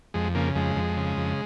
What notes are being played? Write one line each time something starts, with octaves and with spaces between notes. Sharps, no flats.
F2 G#3
C#3 A#3
F2 G#3
F2
C#3
F2